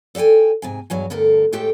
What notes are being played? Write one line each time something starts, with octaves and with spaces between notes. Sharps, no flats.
A4 D5 E5 G5 G#5
G#2 C3 G#5
E2 G2 F#3 G#5
D2 G2 D3 A4 A#4
A2 G#3 G4 A4 G5